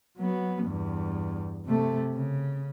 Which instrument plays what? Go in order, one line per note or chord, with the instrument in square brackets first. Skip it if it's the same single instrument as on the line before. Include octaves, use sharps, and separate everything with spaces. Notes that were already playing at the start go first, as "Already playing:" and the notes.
[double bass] F#3 B3
E2 G2
C3 A3
C#3